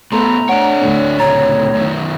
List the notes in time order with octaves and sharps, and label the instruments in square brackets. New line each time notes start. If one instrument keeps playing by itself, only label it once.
[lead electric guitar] A2 B3 [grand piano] A3 [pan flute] A#5 [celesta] C6
[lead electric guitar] D4 C#5 [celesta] F#5 D7
[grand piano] D2 A2
[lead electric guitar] A#2 C#3 [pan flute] C#5 [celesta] A#5 A6
[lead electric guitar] F#2 D#3